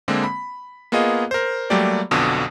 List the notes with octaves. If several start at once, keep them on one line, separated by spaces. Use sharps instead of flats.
D3 G#3 A#3 C4
B5
A#3 B3 F4 G#4 D#5 F5
A#4 C5
F#3 G3 A3 A#3 G4 D5
B1 F2 B2 D3 D#6